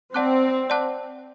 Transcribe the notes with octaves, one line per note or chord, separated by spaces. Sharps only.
C4 D5 F#5 A5 D6 F#6
D5 F#5 A5 D6 F#6